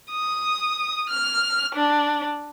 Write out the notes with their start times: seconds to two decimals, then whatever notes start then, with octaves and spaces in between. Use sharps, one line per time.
0.12 D#6
1.10 F6
1.75 D4